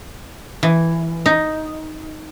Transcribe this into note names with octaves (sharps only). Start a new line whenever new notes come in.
E3
D#4